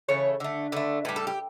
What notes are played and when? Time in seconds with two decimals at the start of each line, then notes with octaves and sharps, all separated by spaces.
0.09 C#3 E3 A3 C#5
0.40 D3 A3
0.72 D3 A3 B4
1.05 A2 G3 B4
1.16 A4
1.27 G4